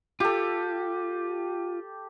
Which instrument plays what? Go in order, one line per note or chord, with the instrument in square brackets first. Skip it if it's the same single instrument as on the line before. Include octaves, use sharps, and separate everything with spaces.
[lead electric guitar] F4 [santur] G4 A4